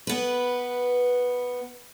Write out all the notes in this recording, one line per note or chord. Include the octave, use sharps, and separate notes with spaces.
B3 B4